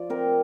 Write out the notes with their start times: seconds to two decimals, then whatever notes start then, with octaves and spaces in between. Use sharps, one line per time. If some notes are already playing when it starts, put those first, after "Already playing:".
Already playing: F3 D5
0.10 C4 A#4